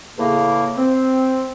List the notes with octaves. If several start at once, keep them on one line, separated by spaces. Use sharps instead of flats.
E2 A2 C#3 A#3
C4